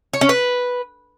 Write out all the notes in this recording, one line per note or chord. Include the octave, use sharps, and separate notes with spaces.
C#5
C#4
B4